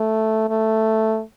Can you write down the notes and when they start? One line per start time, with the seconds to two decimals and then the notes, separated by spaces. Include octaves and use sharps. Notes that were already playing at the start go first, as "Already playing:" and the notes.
Already playing: A3
0.49 A3